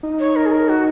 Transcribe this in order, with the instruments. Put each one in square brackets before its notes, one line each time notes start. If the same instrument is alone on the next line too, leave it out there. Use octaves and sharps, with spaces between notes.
[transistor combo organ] D#4
[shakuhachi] C#5
A#4
G#4
A#4
F#4